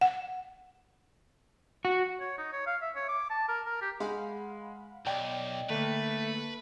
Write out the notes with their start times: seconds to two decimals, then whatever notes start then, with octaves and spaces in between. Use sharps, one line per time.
0.01 F#5
1.85 F#4
2.20 C#5
2.38 D#4
2.53 C#5
2.67 F5
2.82 E5
2.96 C#5
3.09 D6
3.30 A5
3.49 A#4
3.66 A#4
3.82 G4
4.00 G#3 F5 F#5 B5
5.07 B1 D5 D#5 G5 D6
5.70 D3 A3 A#3 B4